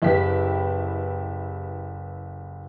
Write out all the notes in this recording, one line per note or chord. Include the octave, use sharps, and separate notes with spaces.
F#1 E4 G4 B4 B6